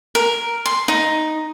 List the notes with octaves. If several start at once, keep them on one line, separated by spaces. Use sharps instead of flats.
A#4
C6
D#4